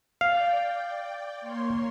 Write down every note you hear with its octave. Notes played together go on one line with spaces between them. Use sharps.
D5 F5 G5
A#3 C#5 C6